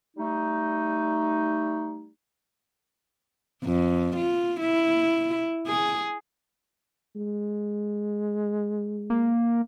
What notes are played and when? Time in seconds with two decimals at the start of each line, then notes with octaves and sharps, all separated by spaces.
0.17 G3 A3 D#4
3.64 F2
4.16 F4
4.60 E4
5.68 G#4
7.16 G#3
9.10 A#3